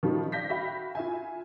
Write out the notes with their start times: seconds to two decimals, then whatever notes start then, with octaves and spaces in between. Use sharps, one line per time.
0.03 D#3 F3 G3 C#4 D#4
0.32 D5 F5 G6 A#6 B6
0.49 F#4 E5 F5 G5 B5
0.95 F4 E5 G#5